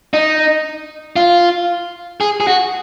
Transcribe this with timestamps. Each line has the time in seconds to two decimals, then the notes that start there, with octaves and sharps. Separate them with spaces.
0.14 D#4
1.16 F4
2.21 G#4
2.40 G#4
2.47 F#4